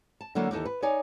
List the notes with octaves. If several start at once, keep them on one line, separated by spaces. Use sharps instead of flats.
A5
D3 F#3 A#3 E4 A4 D5
D#2 E3 D#4 A4
B4
D#4 C#5 D5 G#5